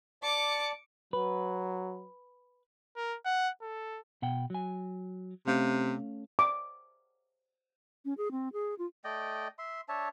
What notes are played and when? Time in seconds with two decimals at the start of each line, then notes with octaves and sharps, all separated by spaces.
0.23 D5 A5 D6 C#7
1.13 F#3 B4
2.96 A#4
3.25 F#5
3.62 A4
4.22 B2 F#5 G5
4.50 F#3 G#5
5.47 C3 A3 C#4 F5
6.39 D6
8.05 C#4
8.18 G#4
8.32 C4
8.53 G#4
8.79 F4
9.04 A3 D5 D#5 G5
9.59 E5 C6
9.89 D4 C#5 E5 A5